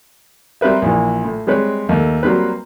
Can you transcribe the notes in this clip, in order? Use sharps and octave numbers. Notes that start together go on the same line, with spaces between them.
G3 C4 A#4 B4 E5
A#1 E3
A2
G3 G#3 C4 B4 C#5
D#2 A3
F#3 G3 A#3 C4 B4